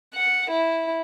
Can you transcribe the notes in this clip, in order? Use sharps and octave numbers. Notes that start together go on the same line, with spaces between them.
F#5
E4